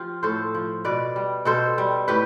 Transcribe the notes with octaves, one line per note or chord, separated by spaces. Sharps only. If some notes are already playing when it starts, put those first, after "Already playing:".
Already playing: F3 F4 G4
A2 A4 C5
F3
B2 B4 D5
G3
B2 A4 C5
G3
A2 G4 B4